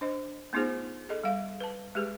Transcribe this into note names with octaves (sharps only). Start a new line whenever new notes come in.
D4 C5 D#5
A3 B3 D#4 F4 G#4 C5
G#4 A4 D#5
G3 F5
B4 A5
G#3 G4 G#4 B4